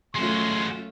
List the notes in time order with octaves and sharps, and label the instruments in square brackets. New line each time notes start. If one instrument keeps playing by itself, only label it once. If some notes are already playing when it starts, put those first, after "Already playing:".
[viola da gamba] F#2 A3 F4 [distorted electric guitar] G#3 F#4 [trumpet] C6